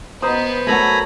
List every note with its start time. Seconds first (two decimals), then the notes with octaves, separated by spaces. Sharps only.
0.22 B3 B4 C5 D#5 A#5 D#6
0.67 F#3 A3 A4 A#4 G#5 A#5 B5